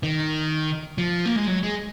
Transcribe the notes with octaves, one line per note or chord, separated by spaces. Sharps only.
D#3
F3
A#3
G#3
F#3
G#3